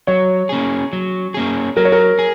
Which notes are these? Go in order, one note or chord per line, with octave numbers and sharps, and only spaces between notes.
F#3 C#5
A#3 C#4 G#4
F#3
A#3 C#4 G#4
F#3 A#4
C#5
A#4
G#4